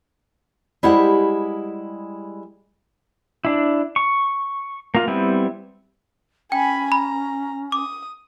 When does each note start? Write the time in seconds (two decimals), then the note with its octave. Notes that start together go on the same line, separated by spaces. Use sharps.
0.83 G3 G#3 E4 G4 C5 F#5
3.45 D4 E4
3.96 C#6
4.95 A#3 F4
5.08 G3 B3 C4 E4
6.52 C#4 G5 G#5 B5
6.92 A#5 B5
7.72 D6 D#6